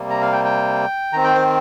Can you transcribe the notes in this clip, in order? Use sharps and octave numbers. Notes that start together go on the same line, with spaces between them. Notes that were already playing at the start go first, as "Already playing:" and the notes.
Already playing: C3 G3 A#3
A#5
F5
G5
G5
D#3 C4 A#5
G5
C5